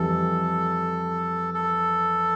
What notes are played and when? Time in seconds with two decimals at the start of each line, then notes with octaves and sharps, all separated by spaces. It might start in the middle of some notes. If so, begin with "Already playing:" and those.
Already playing: F2 E3 G3 A4
1.54 A4